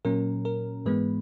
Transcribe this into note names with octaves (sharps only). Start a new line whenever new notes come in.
A#2 F#3 C#4 A#4
A#4
G#2 E3 G#3 B3 B4